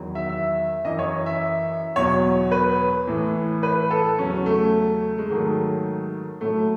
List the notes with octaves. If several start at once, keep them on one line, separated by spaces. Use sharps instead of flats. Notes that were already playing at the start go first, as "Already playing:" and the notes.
Already playing: E2 D#3 F#3
E5
E5
F#2 E3 D#5
C#5
E5
E2 B2 F#3 C#5
B4
A2 E3
B4
A4
E2 C#3 F#3 C#4
A3
G#3
G#2 D#3 F#3 A3
A2 F#3 A3